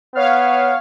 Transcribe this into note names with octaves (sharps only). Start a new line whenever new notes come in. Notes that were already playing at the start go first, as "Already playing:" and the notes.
B3 C#5 F5 F6